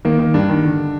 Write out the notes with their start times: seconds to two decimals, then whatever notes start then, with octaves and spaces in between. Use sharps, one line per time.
0.05 D#3 A#3
0.19 D#3
0.34 G2 D4
0.49 D#3
0.64 D3